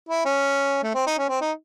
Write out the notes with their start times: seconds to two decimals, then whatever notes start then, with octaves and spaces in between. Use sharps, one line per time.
0.09 E4
0.25 C#4
0.83 A3
0.95 C4
1.07 D#4
1.18 C#4
1.29 C4
1.41 D#4